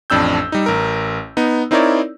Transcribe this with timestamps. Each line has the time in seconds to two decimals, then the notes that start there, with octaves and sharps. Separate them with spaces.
0.10 A1 F2 D4 E6 G6
0.52 G3 D#4
0.66 A1 A#4
1.37 B3 D#4
1.71 C4 D#4 E4 A#4 C#5 D5